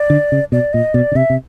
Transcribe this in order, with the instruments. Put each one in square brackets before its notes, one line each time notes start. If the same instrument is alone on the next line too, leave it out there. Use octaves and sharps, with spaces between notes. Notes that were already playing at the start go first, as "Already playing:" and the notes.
Already playing: [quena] D5
[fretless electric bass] D3
C#3
[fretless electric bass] B2 [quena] D5
[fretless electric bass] A#2 [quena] D#5
[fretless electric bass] B2 [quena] D5
[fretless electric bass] C#3
[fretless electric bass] C3 [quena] E5
[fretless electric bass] C3